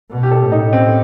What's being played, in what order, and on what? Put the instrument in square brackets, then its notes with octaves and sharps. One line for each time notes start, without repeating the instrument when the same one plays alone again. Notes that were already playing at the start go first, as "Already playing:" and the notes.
[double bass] B2
[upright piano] G4
A4
[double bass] A2
[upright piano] D#4
C4